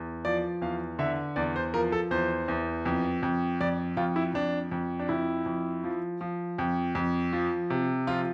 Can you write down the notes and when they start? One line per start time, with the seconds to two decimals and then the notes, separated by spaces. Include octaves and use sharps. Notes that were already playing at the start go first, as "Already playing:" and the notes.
Already playing: E2
0.25 F3 D5
0.61 E2 F5
0.99 D3 E5
1.36 E2 D5
1.56 C5
1.74 F3 A#4
1.92 A4
2.11 E2 C5
2.48 E2
2.85 F2
3.23 F2
3.61 F2 D5
3.97 F2 F4
4.16 E4
4.34 F2 D4
4.71 F2
5.00 D4
5.09 F2 E4
5.46 F2
5.84 F3
6.21 F3
6.58 F2
6.95 F2
7.33 F3
7.70 C3
8.07 F3 F4